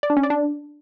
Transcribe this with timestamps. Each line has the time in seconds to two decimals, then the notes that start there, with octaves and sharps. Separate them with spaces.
0.03 D5
0.10 D4
0.17 C#4
0.23 D5
0.30 D4